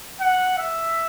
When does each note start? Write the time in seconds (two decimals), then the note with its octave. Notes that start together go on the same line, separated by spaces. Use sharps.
0.20 F#5
0.58 E5